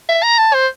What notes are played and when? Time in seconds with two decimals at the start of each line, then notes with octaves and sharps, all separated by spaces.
0.09 E5
0.23 A#5
0.38 A5
0.54 C5